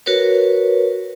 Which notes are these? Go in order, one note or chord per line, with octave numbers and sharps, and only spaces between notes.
F#4 A#4 B4 C#5